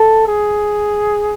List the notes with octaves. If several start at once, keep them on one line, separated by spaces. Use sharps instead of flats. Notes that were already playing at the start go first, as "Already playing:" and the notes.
Already playing: A4
G#4